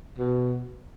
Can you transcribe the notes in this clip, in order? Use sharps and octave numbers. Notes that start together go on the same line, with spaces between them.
B2